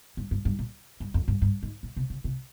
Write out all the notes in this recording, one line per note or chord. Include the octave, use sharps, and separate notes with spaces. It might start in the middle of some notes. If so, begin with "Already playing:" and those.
G2
G2
G2
A#2
G2
F2
G2
G2
G#2
A#2
C3
C#3
C3